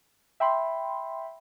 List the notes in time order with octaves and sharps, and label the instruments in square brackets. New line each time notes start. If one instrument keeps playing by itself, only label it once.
[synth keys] E5 G5 B5 C6